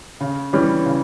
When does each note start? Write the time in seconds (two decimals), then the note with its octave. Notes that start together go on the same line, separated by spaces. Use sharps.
0.21 C#3
0.53 E3 G3 C#4
0.86 C#3